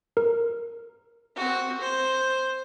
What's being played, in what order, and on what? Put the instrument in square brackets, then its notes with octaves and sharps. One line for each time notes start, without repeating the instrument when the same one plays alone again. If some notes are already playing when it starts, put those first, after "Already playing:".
[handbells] A#4
[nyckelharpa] C4 F#4
C5